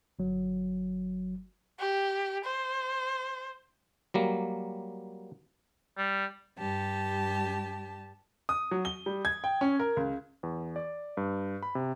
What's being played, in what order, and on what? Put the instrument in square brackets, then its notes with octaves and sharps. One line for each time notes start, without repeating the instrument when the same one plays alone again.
[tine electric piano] G1 F#3
[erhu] G4
C5
[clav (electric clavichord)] F#3 G3 A#3
[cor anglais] G3
[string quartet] G2 G4 A5
[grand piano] D#6
F#3
G7
G3
G#6
G5
C#4
A#4
C#2
[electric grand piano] E2
D5
G2
B5
C3